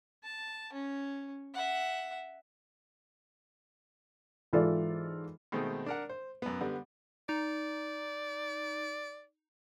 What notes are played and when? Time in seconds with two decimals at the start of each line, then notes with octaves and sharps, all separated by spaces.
0.23 A5
0.73 C#4
1.54 E5 F#5
4.53 G#2 E3 F4 A4 D5
5.52 B2 D#3 G#3 A3 C4
5.86 D4 A#4 F#5
6.09 C5
6.42 F#2 B3
6.61 D3 G3 B3
7.29 D#4 D5